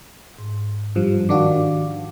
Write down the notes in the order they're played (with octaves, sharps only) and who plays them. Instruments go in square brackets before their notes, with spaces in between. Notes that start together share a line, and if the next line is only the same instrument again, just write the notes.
[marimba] G#2
[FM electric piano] G2 F3 [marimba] G4
[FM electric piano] D#3 D4 F#4 [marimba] F5 D6